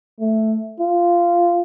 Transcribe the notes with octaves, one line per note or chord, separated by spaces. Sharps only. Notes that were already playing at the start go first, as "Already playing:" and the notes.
A3
F4